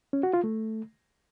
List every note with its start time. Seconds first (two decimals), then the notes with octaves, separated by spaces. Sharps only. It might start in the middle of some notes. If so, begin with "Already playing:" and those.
0.13 C#4
0.23 F#4
0.33 F4
0.44 A3